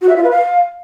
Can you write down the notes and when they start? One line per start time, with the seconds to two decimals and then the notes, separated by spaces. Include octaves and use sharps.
0.01 F#4
0.09 E5
0.16 F4
0.24 B4
0.31 F5